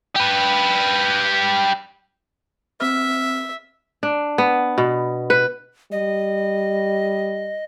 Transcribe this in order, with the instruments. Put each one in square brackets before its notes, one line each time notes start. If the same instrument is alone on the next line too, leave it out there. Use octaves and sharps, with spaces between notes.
[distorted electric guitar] G4 B4
[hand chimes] C4 F6 [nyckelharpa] E5
[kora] D4
B3
B2
B4
[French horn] G3 [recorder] D#5